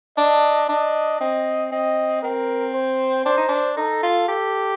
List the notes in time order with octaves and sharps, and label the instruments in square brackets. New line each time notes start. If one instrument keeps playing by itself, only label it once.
[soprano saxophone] D4 [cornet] D#5
[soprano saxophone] D4 [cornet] D#5
[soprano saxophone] C4 [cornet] D#5
[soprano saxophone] C4 [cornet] D#5
[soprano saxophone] C4 [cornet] A#4
[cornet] C5
[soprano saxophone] D4 [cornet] C5
[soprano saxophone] D#4
D4
[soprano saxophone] D#4 [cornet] A4
[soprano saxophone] F4
[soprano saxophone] G4 [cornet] A4